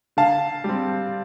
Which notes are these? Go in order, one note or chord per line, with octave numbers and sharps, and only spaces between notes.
D3 F5 A5
G3 C4